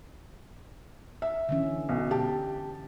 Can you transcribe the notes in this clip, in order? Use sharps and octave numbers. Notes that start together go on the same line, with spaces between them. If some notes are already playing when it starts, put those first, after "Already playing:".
E5
D3 E3 C#4
B1
G4 A5